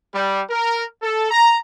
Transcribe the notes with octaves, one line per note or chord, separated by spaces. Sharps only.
G3
A#4
A4
A#5